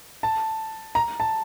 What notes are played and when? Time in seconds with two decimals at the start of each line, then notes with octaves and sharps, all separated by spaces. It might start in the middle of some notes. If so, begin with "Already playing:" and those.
0.23 A5
0.95 A#5
1.20 A5